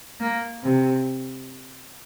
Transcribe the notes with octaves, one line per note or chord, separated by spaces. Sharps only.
A#3
C3